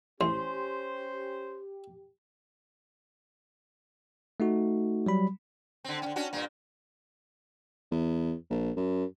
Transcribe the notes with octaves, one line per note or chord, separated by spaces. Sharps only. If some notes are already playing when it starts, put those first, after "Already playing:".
A1 C#4 G4 C5 C6
A3 D#4 F#4
F#3 G3 B5
D3 C4
D3 C#4
C#4 D4 F#4
G2 A#2 A#3
E2
A#1
F#2